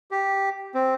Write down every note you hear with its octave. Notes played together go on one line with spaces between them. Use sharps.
G4
C4